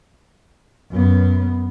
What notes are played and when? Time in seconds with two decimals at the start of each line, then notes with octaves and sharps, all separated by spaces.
0.92 F#2 B3